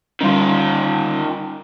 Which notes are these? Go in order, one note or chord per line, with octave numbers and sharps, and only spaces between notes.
D3 D#3 G3 C#4 F4